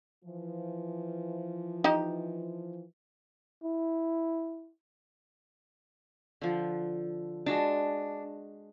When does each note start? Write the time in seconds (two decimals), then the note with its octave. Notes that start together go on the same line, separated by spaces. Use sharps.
0.25 E3 F3
1.84 D#4 G4 D#5
3.64 E4
6.41 D3 F3
7.46 G#3 D4 F#4 A5